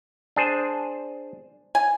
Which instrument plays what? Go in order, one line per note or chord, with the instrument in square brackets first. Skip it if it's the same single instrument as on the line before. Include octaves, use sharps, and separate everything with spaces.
[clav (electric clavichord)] D4 G#4 C5
[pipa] G#5